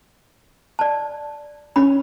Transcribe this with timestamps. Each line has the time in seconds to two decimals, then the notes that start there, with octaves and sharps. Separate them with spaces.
0.79 D5 A5
1.76 C#4 B5